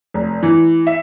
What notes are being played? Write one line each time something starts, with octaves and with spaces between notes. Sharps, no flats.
F1
E3
E5